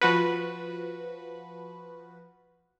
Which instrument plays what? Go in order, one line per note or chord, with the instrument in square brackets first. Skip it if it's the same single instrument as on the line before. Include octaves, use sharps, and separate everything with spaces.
[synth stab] F3 F#4 B4